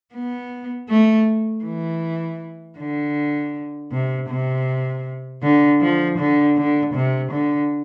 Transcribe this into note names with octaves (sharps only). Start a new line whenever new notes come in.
B3
A3
E3
D3
C3
C3
D3
F3
D3
D3
C3
D3